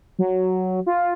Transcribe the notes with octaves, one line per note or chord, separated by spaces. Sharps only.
F#3
F4